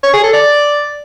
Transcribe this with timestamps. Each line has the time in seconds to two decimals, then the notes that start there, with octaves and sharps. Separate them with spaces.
0.04 C#5
0.13 G#4
0.23 A4
0.33 D5